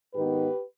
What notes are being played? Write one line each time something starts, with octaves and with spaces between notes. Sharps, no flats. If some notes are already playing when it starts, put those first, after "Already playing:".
G#2 D#3 B3 D#4 G4 B4